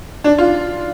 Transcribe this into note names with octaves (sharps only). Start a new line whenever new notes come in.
D4
F4